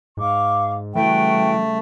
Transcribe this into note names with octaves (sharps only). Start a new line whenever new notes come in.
G#2 F5 C#6 D6
C#3 E3 G3 A3 F#4 G5